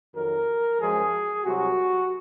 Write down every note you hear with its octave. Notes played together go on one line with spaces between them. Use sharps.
F2 D#3 F#3 A#4
F#2 F3 G#3 G#4
C2 C3 F#3 F#4